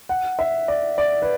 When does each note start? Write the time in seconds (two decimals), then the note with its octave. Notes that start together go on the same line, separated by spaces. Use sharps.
0.09 F#5
0.39 E5
0.68 D5
0.98 D5
1.22 B4